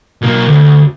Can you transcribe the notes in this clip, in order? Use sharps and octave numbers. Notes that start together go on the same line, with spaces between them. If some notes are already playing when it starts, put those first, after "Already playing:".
B1 A#3
D2